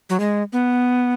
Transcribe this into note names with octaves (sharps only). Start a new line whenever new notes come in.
F#3
G#3
B3